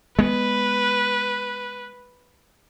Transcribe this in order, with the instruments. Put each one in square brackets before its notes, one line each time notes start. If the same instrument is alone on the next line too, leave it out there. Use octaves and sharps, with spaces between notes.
[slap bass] G#3 B3 [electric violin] B4